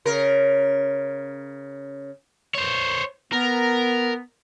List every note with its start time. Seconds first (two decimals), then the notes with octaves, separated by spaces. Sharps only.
0.05 C#3 A#4
2.55 C5 C#5
3.33 B3 A#4